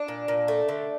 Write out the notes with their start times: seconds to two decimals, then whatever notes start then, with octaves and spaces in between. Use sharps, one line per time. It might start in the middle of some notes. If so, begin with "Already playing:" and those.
Already playing: D4
0.08 A#2
0.28 A#2
0.48 A3
0.69 D3